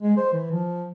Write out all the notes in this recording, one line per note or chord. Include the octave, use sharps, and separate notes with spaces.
G#3
C5
E3
F3